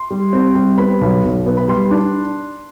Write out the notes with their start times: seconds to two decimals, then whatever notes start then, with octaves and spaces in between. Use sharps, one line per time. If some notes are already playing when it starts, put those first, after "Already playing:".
Already playing: C6
0.11 G3
0.33 C4
0.55 G3
0.78 B3 B5
1.01 B1
1.24 B1
1.46 B3
1.57 B5
1.68 G3 C6
1.91 D4